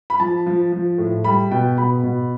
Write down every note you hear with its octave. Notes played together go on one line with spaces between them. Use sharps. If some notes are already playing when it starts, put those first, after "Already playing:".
B5
F3 A5
F3
F3
A2
G3 B5
B2 G5
B2 B5
B2